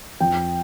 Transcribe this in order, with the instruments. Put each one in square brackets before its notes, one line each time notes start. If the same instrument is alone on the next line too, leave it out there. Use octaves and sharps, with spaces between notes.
[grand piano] F2 G5